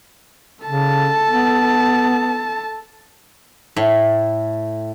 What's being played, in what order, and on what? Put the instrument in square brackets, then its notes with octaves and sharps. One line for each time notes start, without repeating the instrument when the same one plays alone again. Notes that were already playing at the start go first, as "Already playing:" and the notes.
[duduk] C#3 [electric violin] A4 A5
[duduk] B3
[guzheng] A2